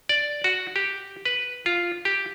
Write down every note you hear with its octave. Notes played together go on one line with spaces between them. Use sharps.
D5
F#4
G4
B4
F4
G4